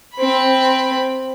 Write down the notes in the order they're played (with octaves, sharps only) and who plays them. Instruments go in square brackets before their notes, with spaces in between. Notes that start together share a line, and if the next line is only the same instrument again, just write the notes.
[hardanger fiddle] C4 B5